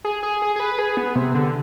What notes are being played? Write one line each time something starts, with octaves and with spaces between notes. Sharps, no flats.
G#4
G#4
G#4
G#4
B4
G#4
B3
C3
D3